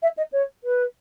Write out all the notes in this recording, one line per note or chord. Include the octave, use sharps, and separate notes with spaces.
E5
D#5
C#5
B4